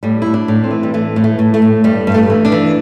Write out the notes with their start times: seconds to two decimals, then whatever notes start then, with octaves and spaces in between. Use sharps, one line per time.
0.03 A2 G3
0.22 A2 E4
0.34 D4
0.48 A2
0.64 C4
0.71 E3
0.83 G3
0.94 E3 A3
1.16 A2
1.24 A3
1.39 A2
1.54 A3
1.62 A2
1.84 G2 G3
2.07 G2
2.14 A3
2.30 E3
2.45 D4
2.52 E3